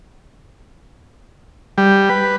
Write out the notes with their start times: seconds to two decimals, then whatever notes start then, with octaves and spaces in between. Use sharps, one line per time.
1.78 G3
2.09 B4